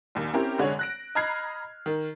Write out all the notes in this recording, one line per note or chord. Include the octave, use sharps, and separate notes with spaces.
A#1 D#2
C4 C#4 E4 G4 A#4
F1 D3 G#3 C#5
F#6 A#6 D7
D#5 A#5 B5 F6 G#6 C7
D#3